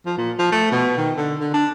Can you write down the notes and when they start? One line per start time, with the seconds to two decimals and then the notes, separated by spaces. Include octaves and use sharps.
0.06 F3
0.18 A#2
0.39 F3
0.52 A3
0.71 B2
0.97 D#3
1.17 D3
1.40 D3
1.54 D4